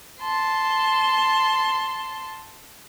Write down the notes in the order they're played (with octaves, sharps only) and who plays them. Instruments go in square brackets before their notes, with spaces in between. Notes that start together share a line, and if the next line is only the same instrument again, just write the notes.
[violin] A5 C6